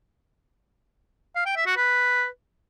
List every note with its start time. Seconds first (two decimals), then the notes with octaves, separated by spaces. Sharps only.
1.36 F5
1.46 G5
1.56 E5
1.66 F#4
1.77 B4